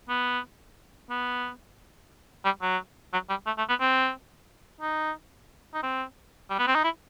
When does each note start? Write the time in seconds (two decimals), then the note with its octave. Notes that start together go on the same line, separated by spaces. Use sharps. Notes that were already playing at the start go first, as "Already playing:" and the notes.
0.09 B3
1.10 B3
2.45 G3
2.62 F#3
3.13 F#3
3.29 G3
3.47 A3
3.58 A3
3.69 B3
3.80 C4
4.81 D#4
5.74 D#4
5.83 C4
6.50 G3
6.59 B3
6.67 C4
6.75 D#4
6.84 E4